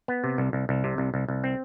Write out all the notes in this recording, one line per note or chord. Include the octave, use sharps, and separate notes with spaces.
B3
C3
C2
C2
C2
C3
C2
C2
C2
C4